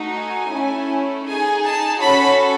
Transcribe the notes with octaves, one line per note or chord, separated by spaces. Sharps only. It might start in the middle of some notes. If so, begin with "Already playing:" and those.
Already playing: A3 D#4 F#4
G#5
A3 C#4 E4 A4
D#4 G#4 G#5
A5
C#4 F#4 A4 B5